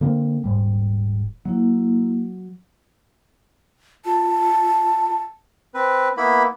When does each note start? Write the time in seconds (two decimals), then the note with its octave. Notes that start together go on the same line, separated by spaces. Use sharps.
0.01 D3 A#3 C4
0.44 D#1 G#2 G3
1.45 F#3 A#3 E4
4.05 F4 A5
5.74 C4 B4
6.17 A#3 B3 E4 B5